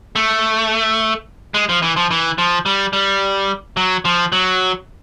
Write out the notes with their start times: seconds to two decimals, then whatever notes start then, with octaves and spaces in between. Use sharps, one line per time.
0.16 A3
1.54 G#3
1.69 F3
1.82 E3
1.96 F3
2.11 E3
2.38 F3
2.66 G3
2.93 G3
3.77 F#3
4.05 F3
4.32 F#3